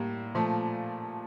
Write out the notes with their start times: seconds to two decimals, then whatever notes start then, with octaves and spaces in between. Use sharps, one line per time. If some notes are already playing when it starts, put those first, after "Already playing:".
Already playing: A2 G3 A#3
0.35 A#2 F3 A3